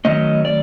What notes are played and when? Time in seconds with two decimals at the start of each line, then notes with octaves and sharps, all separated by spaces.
0.05 D#3 F#3 A3 C#4 D#5
0.45 D5